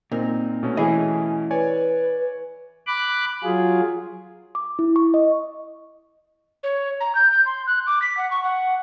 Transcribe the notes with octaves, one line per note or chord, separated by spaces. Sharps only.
A#2 C4 D#4 A#4
B2 A3 C#4
E3 G#4 C5 D#5 G#5
B4 C#5 D5 G#5
B5 D6 F#6
F#3 F4 G#4
D6
E4
C#6
D#5
C#5
A#5
G6
G6
C6
F#6
D6
B6
F#5
C#6
F#5